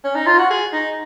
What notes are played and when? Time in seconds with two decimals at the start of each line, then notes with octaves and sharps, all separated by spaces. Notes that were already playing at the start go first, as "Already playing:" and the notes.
0.05 C#4
0.15 D#4
0.27 F4
0.38 F#4
0.51 G#4
0.73 D#4